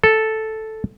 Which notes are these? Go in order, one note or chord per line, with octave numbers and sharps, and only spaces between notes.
A4